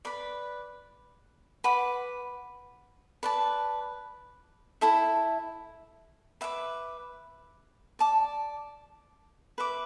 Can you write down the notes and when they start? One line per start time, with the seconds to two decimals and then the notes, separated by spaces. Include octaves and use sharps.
0.05 B4 D5 B5
1.64 B4 F#5 B5 D6
3.23 B4 D5 A5
4.81 E4 A4 E5
6.41 B4 E5 D6
7.99 D5 A5 D6
9.58 B4 E5 D6